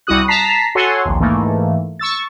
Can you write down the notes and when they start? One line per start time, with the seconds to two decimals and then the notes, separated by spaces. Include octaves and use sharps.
0.07 C2 G3 E4 F#4 D#6 F#6
0.28 A5 A#5 B6 C7
0.75 F#4 A4 C#5 F#5 G#5 C6
1.05 A#1 D#2
1.20 G#2 E3 A3 A#3
1.99 C#6 E6 A6